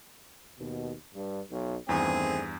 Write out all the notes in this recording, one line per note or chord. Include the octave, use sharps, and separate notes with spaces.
D#2 B2
G2
B1
E2 G2 D#3 A3 C4 G#4